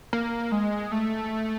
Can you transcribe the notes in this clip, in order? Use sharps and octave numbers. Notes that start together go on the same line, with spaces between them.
A#3
G#3
A3